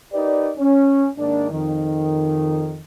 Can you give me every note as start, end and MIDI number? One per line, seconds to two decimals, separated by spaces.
0.13 0.51 63
0.13 0.51 67
0.13 0.51 70
0.13 0.51 71
0.13 0.51 74
0.58 1.07 61
1.18 1.51 44
1.18 1.51 51
1.18 1.51 58
1.18 1.51 62
1.51 2.83 41
1.51 2.83 51